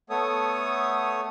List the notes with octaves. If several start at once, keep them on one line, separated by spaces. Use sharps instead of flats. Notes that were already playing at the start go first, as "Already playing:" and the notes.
A3 B3 A4 C#5 D#6